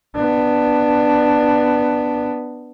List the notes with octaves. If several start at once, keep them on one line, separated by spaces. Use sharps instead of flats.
B3 D4